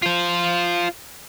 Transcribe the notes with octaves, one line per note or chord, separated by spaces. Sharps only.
F4 C5